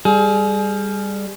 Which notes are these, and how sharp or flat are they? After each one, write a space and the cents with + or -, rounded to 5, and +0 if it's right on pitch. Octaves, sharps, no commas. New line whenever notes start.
G3 +20 G#4 +35